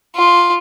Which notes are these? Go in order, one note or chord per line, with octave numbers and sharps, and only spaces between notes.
F4